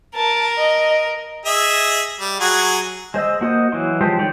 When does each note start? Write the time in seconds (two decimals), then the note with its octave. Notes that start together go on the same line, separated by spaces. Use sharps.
0.16 A#4 A5
0.58 D#5
1.45 G#4 D#5 E5
2.20 G3
2.40 F#3 F#4 G#4
3.14 G#3 C5 D#5 E6
3.41 A#3 F#4 C5 D#5
3.72 E3 F#3 C6
4.01 F3 G#3 G4 C5
4.19 D#3 C#5 D5 G5